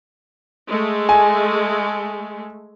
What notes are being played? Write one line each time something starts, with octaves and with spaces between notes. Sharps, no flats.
G#3 A3
G#5